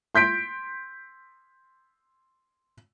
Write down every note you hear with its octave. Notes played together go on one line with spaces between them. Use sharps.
C6 G6 B6 D7